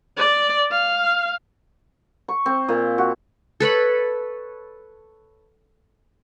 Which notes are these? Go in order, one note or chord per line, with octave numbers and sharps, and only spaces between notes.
D5
F5
C#6
C4
A#2
F#4
A4 B4 C#5 B5